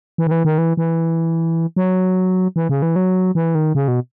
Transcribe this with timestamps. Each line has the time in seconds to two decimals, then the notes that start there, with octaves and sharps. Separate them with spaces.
0.18 E3
0.27 D#3
0.31 E3
0.45 D#3
0.58 E3
0.77 E3
1.76 F#3
2.56 E3
2.69 C#3
2.82 E3
2.96 F#3
3.35 E3
3.55 D#3
3.75 C#3
3.88 B2